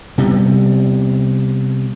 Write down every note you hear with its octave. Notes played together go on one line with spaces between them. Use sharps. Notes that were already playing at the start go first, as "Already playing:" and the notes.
C3 G3 B3